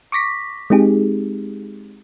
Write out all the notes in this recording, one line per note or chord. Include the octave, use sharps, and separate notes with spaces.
C#6 D6 A#6 B6
G#3 C4 D#4 G4 G#4